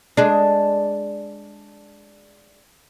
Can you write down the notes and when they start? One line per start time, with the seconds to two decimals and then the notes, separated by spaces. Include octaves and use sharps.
0.17 G#3 D4